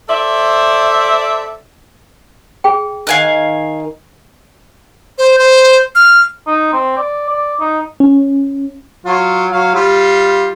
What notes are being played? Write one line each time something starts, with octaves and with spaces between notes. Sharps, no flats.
A4 C5 D5 E5
G#4 G5
D#3 F5 G#5 F#6
C5
C5
F6
D#4
C4
D5
D5
D#4
C#4
F#3 F4
F#3 F5
G3 F4